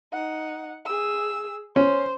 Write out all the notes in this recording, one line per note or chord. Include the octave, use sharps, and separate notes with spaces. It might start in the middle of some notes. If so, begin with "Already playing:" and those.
D#4 F#5
G#4 E6
C#4 C5